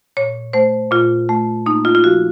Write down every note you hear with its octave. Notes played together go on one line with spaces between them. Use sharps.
A#2 C#5
A3 C5
A#2 F4
A3
A#3 D#4
F4
F4
F3 F#4